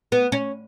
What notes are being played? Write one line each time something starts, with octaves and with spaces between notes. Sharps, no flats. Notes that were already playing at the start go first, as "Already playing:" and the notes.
B3
C#4